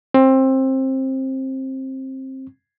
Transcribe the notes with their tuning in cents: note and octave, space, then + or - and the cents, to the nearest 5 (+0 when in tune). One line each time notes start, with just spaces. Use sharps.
C4 +20